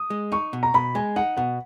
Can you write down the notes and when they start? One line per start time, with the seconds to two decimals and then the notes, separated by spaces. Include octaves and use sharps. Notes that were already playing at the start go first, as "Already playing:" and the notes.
Already playing: D#6
0.10 G#3
0.32 D#4 C#6
0.53 B2
0.63 A#5
0.74 B2 B5
0.95 G#3 G#5
1.16 D#4 F#5
1.37 B2 F#5